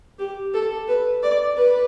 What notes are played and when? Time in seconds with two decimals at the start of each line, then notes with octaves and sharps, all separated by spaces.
0.19 G4
0.54 A4
0.88 B4
1.23 D5
1.57 B4